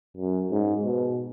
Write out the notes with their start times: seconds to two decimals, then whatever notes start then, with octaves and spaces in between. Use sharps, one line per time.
0.17 F#2
0.51 G#2
0.84 B2